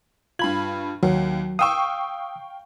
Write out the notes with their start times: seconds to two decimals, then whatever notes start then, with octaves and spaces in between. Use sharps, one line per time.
0.39 G2 F4 B5 G#6 F#7
1.03 D#2 F#3
1.59 F5 G5 C#6 D#6 E6